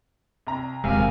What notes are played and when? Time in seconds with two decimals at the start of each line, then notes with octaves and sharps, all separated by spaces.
0.47 C2 A#5
0.84 D#1 C3 G#3 A#4 F5 G#5